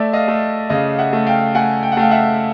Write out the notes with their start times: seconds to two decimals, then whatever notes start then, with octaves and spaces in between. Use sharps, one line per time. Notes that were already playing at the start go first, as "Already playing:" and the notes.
Already playing: A3 D5 E5
0.13 D#5 F5
0.28 A3
0.70 C#3 D#5 F5
0.98 E5 F#5
1.13 A3
1.27 F5 G5
1.55 A3 F#5 G#5
1.83 G5
1.92 F#5
1.97 A3 F5 G5
2.11 E5 F#5